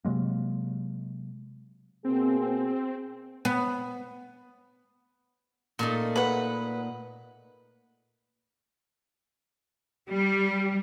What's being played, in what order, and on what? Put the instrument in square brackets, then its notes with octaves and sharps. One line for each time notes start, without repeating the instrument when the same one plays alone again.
[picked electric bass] C3 F#3 G#3 A#3
[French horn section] B2 A#3 G#4 [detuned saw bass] C4
[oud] B3
[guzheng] A#2 A3 D#4
[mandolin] B4 F#5
[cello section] G3